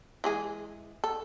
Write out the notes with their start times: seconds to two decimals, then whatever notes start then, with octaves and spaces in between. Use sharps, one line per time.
0.24 E3 G#3 G#4
1.04 A4